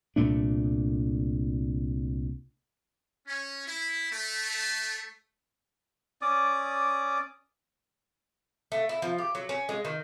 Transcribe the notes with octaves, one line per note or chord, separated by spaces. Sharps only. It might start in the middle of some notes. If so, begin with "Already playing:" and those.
C2 A#2 A3 D4
C#4
E4
A3
C#4 D5 D6 D#6
A3
E4
F3
G4
F#3
C#4
G#3
D#3